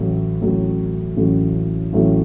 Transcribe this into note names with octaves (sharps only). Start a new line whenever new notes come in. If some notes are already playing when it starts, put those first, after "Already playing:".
Already playing: A1 A2 F#3 A3
A1 A2 F#3 A3
A1 A2 F#3 A3
A1 A2 F#3 A3